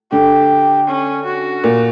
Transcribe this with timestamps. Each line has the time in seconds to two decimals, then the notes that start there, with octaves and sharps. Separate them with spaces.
0.11 D3 G4
0.88 C#4
1.25 F#4
1.64 A#2